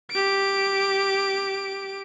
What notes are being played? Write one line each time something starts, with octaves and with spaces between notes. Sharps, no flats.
G4 D7